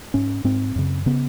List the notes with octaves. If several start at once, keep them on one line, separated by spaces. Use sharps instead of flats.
G#2 C#4
G#2 C4
F#2 C#3
C#3 B3